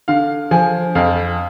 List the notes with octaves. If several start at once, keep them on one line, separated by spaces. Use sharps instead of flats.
D3 F5
F3 G#5
F2 F5